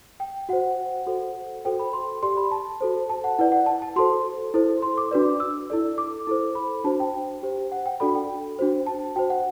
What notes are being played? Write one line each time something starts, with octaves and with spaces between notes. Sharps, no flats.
G5
F#4 C5 F#5
F#4 A4 C5
F#4 A4 C5 G5
B5
C6
G4 D5 C6
B5
A5
F#4 A4 C5
A5
F#5
E4 B4 D5 F#5
F#5
A5
A5
F#4 A4 C5 C6
E4 A4 C5
C6
D6
D4 F#4 B4 D5
E6
E4 A4 D5
D6
E4 A4 C5
B5
D4 F#4 C5 A5
G5
G4 C5
F#5
G5
D4 F#4 A4 D5 B5
G5
D4 F#4 C5
A5
F#4 C5 G5
F#5